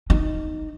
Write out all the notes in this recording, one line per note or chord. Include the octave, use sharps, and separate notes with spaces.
D#4